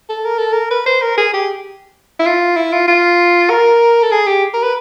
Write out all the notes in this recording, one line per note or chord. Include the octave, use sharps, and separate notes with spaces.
A4
A#4
A4
A#4
B4
C5
A#4
G#4
G4
E4
F4
E4
F4
F4
A#4
A4
G#4
G4
A#4
B4